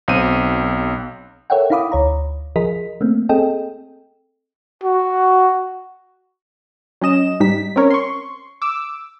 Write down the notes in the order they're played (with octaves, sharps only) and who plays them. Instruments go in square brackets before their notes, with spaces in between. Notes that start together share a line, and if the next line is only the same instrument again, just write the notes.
[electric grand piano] B1 C4 D#7
[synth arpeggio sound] A4 A#4 C#5 E5 F#5 G5
D#4 E4 F5 B5 D6 D#6
D2 C#5 A#5
F3 G#4 A#4 D#5 B6
A3 A#3 C4
C4 G#4 A4 D#5 G5
[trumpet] F#4
[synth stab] F#3 C#4 D#5 E7
G#2 G3 D#4 B6
C4 C#4 A#4 C#5
C6 C#6
D6 E6